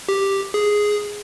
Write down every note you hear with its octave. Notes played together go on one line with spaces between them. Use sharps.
G4
G#4